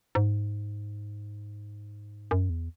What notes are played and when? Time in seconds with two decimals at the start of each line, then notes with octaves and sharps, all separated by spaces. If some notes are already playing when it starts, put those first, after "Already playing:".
0.15 G#2
2.31 F#2
2.50 E2